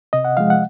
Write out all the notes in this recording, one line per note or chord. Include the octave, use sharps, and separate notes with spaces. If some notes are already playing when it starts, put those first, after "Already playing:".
C3 D#5
F#5
F3 G#3 F5
F#5